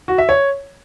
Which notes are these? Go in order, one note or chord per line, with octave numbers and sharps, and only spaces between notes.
F#4
E5
C#5